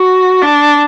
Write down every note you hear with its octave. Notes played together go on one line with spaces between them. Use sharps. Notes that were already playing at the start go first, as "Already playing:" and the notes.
Already playing: F#4
D4